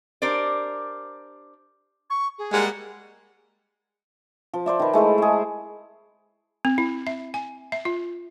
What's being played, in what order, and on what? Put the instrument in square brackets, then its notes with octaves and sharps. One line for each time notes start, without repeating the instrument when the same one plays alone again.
[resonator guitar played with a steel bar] D4 G4 A#4 C5 D5
[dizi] C#6
G#4
[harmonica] G3 A#3 F#5 [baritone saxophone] G#3
[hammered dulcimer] F3
C5 D5 E5
D#3 B4
G#3 A3 E4 C5
G#4 E5
[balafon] C4
E4
E5
G#5
E5
F4